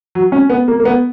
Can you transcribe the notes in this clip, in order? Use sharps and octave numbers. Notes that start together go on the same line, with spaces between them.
F#3
C#4
B3
A#3
A#3
B3